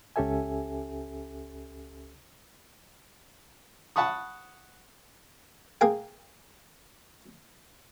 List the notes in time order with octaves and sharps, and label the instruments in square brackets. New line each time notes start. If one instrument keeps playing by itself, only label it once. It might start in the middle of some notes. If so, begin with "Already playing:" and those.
[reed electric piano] C#2 C#4 G4 A4 E5 G#5
[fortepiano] F#5 A5 B5 C#6 D#6
[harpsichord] A#3 G#4 G5